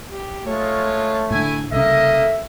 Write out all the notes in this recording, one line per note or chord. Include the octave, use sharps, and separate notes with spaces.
G4
G#3 A3 F4 C#5
A2 D3 E4 G#5
C2 C#3 A#3 A4 D#5 E5